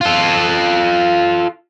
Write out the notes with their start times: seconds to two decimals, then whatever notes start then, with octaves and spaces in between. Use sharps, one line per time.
0.01 F4 A4